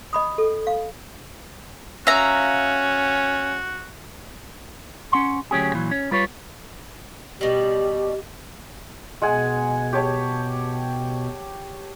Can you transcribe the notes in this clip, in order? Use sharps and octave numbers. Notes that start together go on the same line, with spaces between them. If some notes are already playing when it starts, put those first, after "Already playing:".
D#5 B5 D#6
A4
F5
C#4 F#4 E5 F5 A#5
C#4 F#5 C6
D2 F#3 C#4 G4 G#4
A#2 E3 F#3
C#4
G3 F4 B4 C#5
B2 G3 G4
B2 G#3 F#5 G#5
G4 C#5 A5